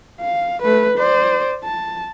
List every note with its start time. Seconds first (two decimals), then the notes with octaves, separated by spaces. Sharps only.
0.21 F5
0.62 A3 B4
0.98 C5 D5
1.64 A5